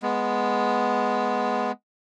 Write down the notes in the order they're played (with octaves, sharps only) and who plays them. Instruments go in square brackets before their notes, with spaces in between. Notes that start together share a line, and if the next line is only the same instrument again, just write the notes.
[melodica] G#3 B3